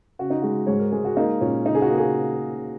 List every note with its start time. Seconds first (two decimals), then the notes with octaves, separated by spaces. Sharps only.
0.19 C#3 F#4
0.30 D#4
0.42 G#3 F#4
0.67 G#2 C#5
0.79 A#4
0.92 G#3 G#4
1.05 F#4
1.16 A#3 D#4
1.41 A#2 C#4
1.66 C#3 D#4
1.75 G#4
1.82 F#4
1.90 A#3
1.98 G#4